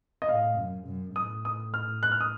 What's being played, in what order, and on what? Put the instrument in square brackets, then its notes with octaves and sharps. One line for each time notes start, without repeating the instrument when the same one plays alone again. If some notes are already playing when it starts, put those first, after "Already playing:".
[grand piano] D#5
[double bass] A2 [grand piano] F5
[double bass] F#2
F#2
[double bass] A2 [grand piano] D#6
[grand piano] D#6
F6
F#6
F6
D#6